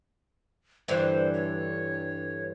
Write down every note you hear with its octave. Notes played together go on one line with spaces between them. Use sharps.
G2 D3 E3 C5
C#5